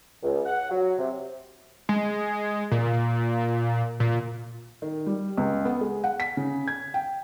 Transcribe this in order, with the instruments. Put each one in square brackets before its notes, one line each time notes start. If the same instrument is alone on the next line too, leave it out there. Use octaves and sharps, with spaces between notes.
[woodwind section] C#2
F#5
F#3
C3
[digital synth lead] G#3
A#2
A#2
[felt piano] D#3
G3
C#2
B3
G#3
F#5
B6
C#3
G#6
G5